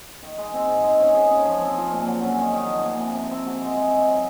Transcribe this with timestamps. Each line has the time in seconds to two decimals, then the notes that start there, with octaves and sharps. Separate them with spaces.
0.22 D#3
0.38 G#3
0.54 C4
0.68 G#2
0.84 G#3
1.00 C#4
1.14 G#4
1.31 C#3
1.46 F3
1.61 C4
1.77 F4
1.92 A#2
2.07 F#3
2.22 C#4
2.38 D#3
2.54 D#3
2.68 F3
2.85 A#3
2.99 C3
3.15 C3
3.31 C4
3.46 F#4
3.61 G#3
3.77 G#3
3.92 D#3
4.07 F#3